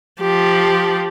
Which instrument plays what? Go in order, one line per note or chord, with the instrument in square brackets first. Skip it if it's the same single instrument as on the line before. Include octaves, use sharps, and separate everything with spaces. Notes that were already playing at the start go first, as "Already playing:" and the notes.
[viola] F3 G4